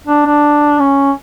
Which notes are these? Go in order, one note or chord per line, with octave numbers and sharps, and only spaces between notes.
D4
D4
C#4